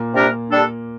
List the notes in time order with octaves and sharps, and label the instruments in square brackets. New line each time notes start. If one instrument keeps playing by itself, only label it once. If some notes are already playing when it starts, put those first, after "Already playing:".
Already playing: [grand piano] A#2 A#3
[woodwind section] C3 G3 D4 G4 A#4
G3 D4 A4